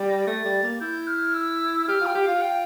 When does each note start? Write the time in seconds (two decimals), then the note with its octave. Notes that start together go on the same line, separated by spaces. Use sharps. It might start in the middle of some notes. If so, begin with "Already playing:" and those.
Already playing: G3
0.08 A#6
0.27 A3 A6
0.45 G3
0.63 A#3
0.80 E4 G6
1.07 F6
1.34 E6
1.87 G4 F6
2.01 F4
2.06 G5
2.15 G4
2.23 F4 F5
2.41 G5